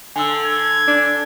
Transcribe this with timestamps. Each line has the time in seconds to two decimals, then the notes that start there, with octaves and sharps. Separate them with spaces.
0.16 D3 G#5 E6
0.46 G#6
0.88 D4